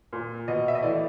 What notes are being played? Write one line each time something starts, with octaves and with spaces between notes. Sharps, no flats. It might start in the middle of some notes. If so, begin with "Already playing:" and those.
A#2
B2 D#5
E5
D#5
A2 E3 D5